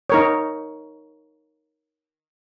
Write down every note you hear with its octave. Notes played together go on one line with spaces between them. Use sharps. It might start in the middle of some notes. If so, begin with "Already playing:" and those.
D#4 A#4 C#5